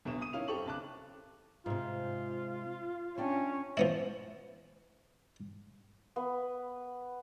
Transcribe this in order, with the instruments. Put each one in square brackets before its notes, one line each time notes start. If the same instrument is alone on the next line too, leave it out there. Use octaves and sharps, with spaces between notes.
[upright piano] G1 D2 B2 E7
D#6 D#7
D#3 C#4 E4 F5 F7
F#2 C4 G4 A4 C#6 F#7
B1 C#3 A5 D6 F#6
[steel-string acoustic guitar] G#2 C3 [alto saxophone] F4
[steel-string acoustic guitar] A3 D4 G5 [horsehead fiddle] C#4
[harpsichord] F3 B3 E4
[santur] B3